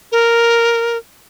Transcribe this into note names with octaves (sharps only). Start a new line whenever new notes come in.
A#4